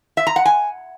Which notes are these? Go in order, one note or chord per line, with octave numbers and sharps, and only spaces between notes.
E5
A#5
F#5
G#5